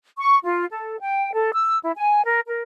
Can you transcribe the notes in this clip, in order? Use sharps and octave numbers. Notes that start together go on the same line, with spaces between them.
C#6
F4
A4
G5
A4
E6
E4
G#5
A#4
A#4